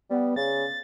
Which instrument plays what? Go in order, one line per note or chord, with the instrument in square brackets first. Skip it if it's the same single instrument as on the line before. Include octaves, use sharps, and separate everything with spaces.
[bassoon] G3 [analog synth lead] B3
[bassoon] C#3 [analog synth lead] A6